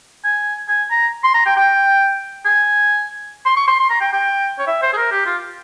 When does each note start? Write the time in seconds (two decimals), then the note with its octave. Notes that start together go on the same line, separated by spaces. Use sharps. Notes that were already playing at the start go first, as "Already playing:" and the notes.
0.25 G#5
0.68 G#5
0.91 A#5
1.24 C6
1.34 A#5
1.46 G5
1.57 G5
2.46 G#5
3.46 C6
3.57 C#6
3.67 C6
3.79 C6
3.90 A#5
4.01 G5
4.13 G5
4.59 C#5
4.67 E5
4.83 C5
4.93 G#4
4.97 A#4
5.11 G4
5.26 F4